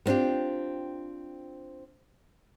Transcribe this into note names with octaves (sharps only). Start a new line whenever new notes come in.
B3 C4 D4 F4 G4